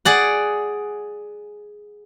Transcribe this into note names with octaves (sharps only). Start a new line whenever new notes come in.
G#4 D5 F#5